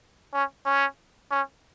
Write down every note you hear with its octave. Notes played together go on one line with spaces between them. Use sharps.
C#4
C#4
C#4